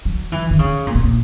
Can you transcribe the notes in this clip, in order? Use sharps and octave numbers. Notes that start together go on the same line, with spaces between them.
F#3
E3
D#3
C#3
A#2
B2
A#2